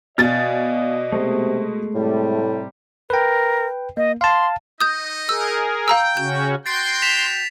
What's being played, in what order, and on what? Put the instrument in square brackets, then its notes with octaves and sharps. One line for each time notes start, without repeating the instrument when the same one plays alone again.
[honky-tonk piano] B2 A6 [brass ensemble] D5 D#5 [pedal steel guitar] F5 G#5 F6
[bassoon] C3 [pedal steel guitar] G#3 A3
[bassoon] A2 [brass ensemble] C3 G3
[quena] A#4 [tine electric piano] B4 G5
[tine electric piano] A#3 [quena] D#5
[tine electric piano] F5 A5 [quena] C6
[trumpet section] D#4 D#5 [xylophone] D#6 G6
[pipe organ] G#4 A#4 [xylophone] E6
[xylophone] F5 A#5 E6 [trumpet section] G5
[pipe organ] C#3 C#4 F#4 [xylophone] G6
[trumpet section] F#4 G5 [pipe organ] C6 [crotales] A6 C7 D7
[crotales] B6 E7 F7